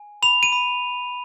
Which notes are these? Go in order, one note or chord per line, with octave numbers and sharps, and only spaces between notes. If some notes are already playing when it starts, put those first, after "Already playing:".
Already playing: G#5
B5 F7
D#7
B5